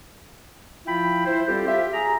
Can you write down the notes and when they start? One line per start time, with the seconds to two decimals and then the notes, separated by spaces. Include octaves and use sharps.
0.86 F3 E4 F4 G5 B5
1.26 E4 C5
1.48 G3 C4 F4 G4 A4 C5
1.67 F4 G4 E5
1.93 G#4 A#5